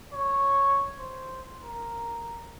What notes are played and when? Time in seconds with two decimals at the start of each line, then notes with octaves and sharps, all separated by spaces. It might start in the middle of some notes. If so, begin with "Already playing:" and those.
0.14 C#5
0.99 C5
1.63 A#4